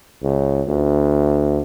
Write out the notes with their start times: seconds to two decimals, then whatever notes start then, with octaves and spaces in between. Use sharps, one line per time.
0.23 C#2
0.68 D2